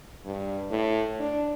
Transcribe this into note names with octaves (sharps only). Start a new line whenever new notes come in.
G2
A2
D4